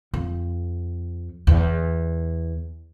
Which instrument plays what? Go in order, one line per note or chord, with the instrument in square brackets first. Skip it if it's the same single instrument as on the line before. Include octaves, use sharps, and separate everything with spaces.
[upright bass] F2
E2